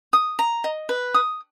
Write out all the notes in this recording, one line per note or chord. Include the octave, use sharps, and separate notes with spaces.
D#6
A#5
D#5
B4
D#6